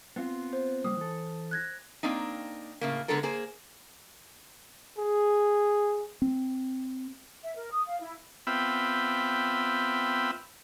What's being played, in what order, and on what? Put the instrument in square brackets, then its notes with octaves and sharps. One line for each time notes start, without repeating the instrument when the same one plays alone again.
[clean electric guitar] B3 C4 F4
[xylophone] C5
[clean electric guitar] C#3 G3 A#3 [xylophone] D#6
[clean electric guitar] E3 A4
[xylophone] F#6 G#6 A#6
[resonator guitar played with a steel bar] A#3 C4 D4 D#4
A2 C#3 A#3
D3 G#3 B3 D4 A4 A#4
A#3 G#4 C5
[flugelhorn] G#4
[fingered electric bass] C4
[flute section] E5
A#4
D#6
F5
E4
[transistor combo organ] B3 C4 F4 E5 G5 B5